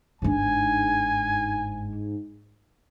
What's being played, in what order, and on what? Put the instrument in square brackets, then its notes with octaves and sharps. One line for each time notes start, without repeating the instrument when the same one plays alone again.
[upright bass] G1 D4 [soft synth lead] G#2 [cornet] G#5